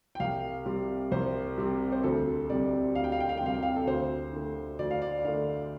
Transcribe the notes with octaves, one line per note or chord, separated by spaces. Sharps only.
G5
C2 F5
C3 G3 C4
C2 C5
C3 G3 C4
C5
D2 A4
C3 G3 C4 D5
D2 F5
G5
F5
G5
F5
G5
C3 G3 C4 F5
G5
F5
A4
D2 C5
D3 A3
D2 D5
F5
D5
D3 A3 F5